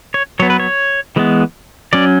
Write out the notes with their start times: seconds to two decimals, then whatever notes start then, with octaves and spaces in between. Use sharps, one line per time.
0.14 C#5
0.40 F#3 B3 C#5
0.50 B4
0.60 C#5
1.16 E3 G#3 B3
1.93 F#3 C#4 D5